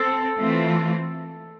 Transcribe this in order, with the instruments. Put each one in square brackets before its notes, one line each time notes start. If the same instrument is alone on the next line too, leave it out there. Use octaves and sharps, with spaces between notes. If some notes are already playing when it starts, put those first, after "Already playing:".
Already playing: [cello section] C4 [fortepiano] A4
[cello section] E3 A3 C4 F4